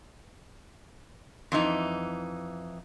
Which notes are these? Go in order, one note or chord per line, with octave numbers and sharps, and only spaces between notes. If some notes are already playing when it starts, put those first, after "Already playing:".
F2 E3 D#4